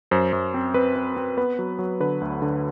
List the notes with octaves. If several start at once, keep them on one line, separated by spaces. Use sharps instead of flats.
F#2 C5
F#2
C4
C4 B4
C4
C4
B3 B4
F#3
F#3
D3 B4
D2
D3